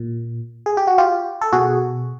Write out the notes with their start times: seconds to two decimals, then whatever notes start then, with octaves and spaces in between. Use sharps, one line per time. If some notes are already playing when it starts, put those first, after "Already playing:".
Already playing: A#2
0.66 G#4
0.77 G4
0.87 F#4
0.98 F4 G4
1.41 A4
1.53 B2 F#4 G#4